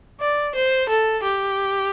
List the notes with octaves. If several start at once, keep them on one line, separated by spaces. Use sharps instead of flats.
D5
C5
A4
G4